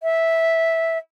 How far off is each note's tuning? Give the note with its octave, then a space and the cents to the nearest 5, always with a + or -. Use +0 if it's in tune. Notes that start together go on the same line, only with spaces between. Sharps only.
E5 -10